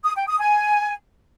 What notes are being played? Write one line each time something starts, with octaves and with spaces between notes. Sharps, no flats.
D#6
G5
D#6
G#5